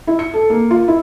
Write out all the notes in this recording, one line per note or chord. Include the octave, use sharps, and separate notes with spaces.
E4
C#7
A4
A#3
F4
E4